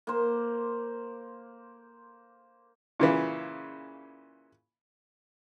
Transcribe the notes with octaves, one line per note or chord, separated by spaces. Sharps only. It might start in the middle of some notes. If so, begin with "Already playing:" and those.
A#3 C5
A#2 C#3 E3